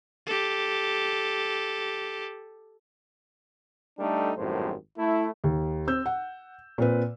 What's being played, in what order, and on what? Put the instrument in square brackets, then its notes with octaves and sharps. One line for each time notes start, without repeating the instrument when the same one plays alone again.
[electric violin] G4 A4
[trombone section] G3 A3 D4 D#4 A4
G#1 F#2 A2 G3 C5
A3 E4
[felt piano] D#2
C4 E6 G6
F#5
A#2 C4 B4